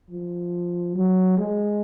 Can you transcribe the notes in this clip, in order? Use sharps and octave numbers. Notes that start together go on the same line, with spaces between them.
F3
F#3
G#3